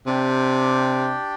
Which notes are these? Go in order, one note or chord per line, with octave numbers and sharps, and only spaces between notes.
C3 D4 G4 D5 G5